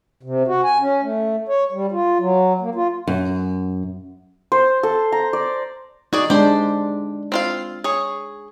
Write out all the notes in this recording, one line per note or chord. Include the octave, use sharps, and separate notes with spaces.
C3
F#4
G#5
C#4
A3
C#5
G3
F4
F#3
A#3
F4
F#2
C5
A4
A#5
D5
D#4 F#4 G#4 D5
G#3 D4 G4 C5
C4 F4 F5
G#4 C#5